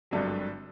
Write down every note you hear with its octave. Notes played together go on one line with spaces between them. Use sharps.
G#1 G2 D3 F#3